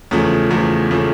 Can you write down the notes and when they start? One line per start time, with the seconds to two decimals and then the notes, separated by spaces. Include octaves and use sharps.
0.11 E2 C#3 F3 A3
0.50 E2 C#3 F3 A3
0.91 C#3 F3 A3